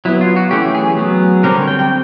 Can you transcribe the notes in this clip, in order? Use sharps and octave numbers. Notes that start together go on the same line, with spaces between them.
F#3 B3 E4
F4
F#4
E3 A3 C#4 G4
G#4
F#3 B3
D3 G3 C4 A#4
C#5
G5
G5